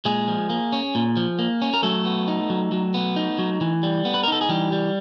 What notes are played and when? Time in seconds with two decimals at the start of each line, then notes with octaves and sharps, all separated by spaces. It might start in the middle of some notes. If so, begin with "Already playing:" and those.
0.05 A#2 G#3 G#4
0.28 F3
0.50 A#3
0.73 C#4
0.95 A#2
1.17 F3
1.39 A#3
1.62 C#4
1.74 A#4
1.83 F#3 A3 A4
2.05 B3
2.28 D#4
2.50 F#3
2.72 F#3
2.94 B3
3.16 D#4
3.39 F#3
3.61 E3
3.83 G3
4.05 B3
4.14 B4
4.23 A#4
4.28 D#4 A4
4.41 G#4
4.49 E3 G3 G4
4.72 G3